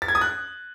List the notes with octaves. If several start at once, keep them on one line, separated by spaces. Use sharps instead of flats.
A6
G#6
D#6
F#6